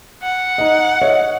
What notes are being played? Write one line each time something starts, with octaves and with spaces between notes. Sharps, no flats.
F#5
D#4 D#5
C#5 D#5 E5